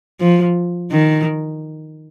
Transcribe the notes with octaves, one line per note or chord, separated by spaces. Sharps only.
F3
D#3